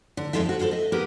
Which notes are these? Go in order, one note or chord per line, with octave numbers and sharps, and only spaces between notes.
D3
F2 F#3 G#3 F4 A4 E5
C4 F#4
E4 F4 G4 A4 C5
D#5 E5
A#3 B3 G4 A#4 B4